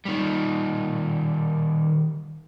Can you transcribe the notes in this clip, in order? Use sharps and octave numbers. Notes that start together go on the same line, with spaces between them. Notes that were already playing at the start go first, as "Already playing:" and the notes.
D#3 G3